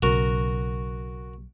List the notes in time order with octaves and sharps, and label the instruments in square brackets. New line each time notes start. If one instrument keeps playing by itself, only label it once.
[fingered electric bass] B1 C#3 [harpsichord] F#4 A#4